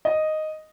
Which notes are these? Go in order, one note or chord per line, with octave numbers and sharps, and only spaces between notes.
D#5